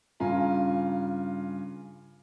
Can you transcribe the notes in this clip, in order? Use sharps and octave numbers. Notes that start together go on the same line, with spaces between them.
G2 C#3 F4 G#5 A#5